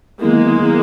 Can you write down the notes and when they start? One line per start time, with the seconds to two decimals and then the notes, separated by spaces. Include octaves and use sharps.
0.21 D#3 F#3 G#3 A#3 B3 E4
0.60 D#3 F#3 B3 E4